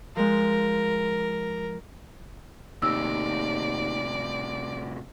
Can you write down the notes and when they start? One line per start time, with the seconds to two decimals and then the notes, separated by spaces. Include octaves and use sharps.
0.16 F3 G#3 A#4
2.82 D#2 A2 C3 D5 E6